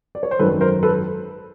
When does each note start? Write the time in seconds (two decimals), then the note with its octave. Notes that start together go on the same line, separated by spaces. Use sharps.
0.15 D5
0.23 C#5
0.31 C5
0.39 G#1 F#2 D#3 A4 B4
0.61 A#4 C5
0.83 A4 B4